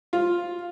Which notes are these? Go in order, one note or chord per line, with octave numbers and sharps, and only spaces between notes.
F4